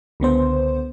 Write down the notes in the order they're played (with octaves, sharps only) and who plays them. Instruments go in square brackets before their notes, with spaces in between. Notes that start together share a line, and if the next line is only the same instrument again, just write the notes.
[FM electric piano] C#2 D3 B3 C5